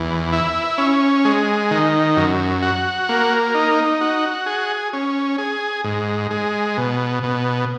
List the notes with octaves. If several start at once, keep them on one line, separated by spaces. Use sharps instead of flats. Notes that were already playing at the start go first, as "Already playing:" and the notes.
Already playing: E2
E4
C#4
G#3
D#3
F#2
F#4
A#3
D#4
F#4
G#4
C#4
G#4
G#2
G#3
B2
B2